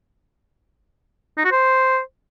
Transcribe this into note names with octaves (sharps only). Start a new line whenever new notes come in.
D#4
F#4
C5